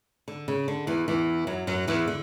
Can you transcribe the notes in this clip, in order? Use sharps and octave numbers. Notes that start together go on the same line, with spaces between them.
D3
C#3
D3
E2 E3
E2 E3
F#2 F#3
F#2 F#3
E2 E3
D3